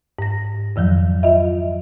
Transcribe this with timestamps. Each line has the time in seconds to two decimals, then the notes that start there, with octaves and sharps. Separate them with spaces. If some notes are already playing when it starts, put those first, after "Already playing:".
0.19 G#2 A#6
0.76 F2 D#3 F3 F#3
1.23 F4 D#5 E5